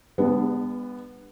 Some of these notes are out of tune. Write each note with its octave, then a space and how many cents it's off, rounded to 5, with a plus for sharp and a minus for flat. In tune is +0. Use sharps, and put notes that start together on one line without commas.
G#3 -45 B3 +0 D4 +25